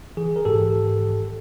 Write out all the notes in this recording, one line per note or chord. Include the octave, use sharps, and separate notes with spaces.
E3 G#4
A#4
G#2 G4 A4
D#3
D#3